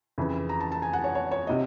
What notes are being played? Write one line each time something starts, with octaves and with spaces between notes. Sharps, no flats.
F2 C#3 E3
A#5
A5
A5
G#5
F#5
C#5
C#5
C#5
C3 D#5